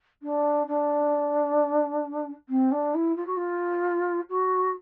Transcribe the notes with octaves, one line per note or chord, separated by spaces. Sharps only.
D4
D4
C4
D4
E4
F4
F#4
F4
F#4